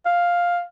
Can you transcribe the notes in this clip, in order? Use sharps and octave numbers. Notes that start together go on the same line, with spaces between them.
F5